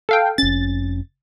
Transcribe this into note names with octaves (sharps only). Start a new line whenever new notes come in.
A4 F5 G5
F1 C#4 A6